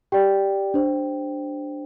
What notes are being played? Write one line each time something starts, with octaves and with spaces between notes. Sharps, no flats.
G4 D5 G5
D4 C5